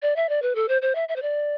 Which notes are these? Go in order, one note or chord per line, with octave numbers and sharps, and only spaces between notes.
D5
E5
D5
B4
A4
C5
C5
E5
E5
C5
D5